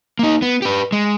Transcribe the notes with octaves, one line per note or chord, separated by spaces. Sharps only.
A#3 D#4
B3
G4 B4
G#3